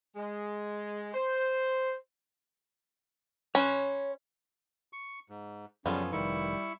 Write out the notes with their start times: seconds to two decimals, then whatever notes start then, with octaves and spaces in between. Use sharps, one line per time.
0.16 G#3
1.14 C5
3.55 C#4 C#5 B5 C6
4.93 C#6
5.29 G#2
5.86 F#2 C#3 F3 G3 B3 C#4 F4 A4
6.12 F1 D#3 G3 E4 C#6